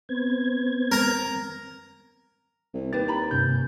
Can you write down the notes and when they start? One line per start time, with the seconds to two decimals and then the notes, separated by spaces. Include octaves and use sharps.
0.09 B3 C4 G#6
0.92 A#4 A#5
2.74 C2
2.93 D#2 G4 B4 A6
3.08 A#5 B5
3.31 G2 C3 C#4 G6